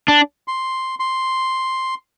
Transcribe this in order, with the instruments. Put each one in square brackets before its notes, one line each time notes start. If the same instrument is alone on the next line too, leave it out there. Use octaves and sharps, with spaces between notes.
[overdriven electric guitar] D4
[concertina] C6
C6